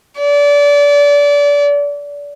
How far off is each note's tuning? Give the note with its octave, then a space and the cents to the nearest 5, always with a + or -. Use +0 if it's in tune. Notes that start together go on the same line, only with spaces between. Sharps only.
D5 -30